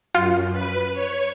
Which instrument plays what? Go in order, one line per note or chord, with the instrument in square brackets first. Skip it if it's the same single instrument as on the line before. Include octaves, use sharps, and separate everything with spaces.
[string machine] F#2 [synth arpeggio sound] F4
[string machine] B4
C#5